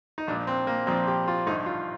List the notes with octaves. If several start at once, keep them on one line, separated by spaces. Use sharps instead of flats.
D#4
A#1 A#2 F3 D4
C4
A#3
A#1 A#2 F3 C4
G4
F4
A1 G2 D3 F3 D#4
F4